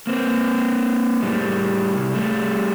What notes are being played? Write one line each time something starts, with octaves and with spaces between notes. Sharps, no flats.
A#3 C4
A2 G3
C2
G3 A3